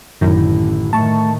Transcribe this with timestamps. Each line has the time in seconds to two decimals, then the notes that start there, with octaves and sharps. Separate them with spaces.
0.21 A1 F#2 D3 D#3 E4
0.93 A2 D#3 A3 A5 C#6